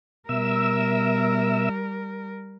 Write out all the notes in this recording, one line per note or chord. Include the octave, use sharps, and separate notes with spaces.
B2 G3 A#4 E5 E6